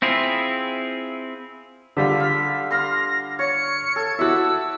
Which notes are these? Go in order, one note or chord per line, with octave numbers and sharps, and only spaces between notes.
C4 E4 F4 G#4
D3 G3 F4 B6
F5
F5 C6 A#6
C#5 C#7
A4 G#6
E4 F#4 E5 D6 E6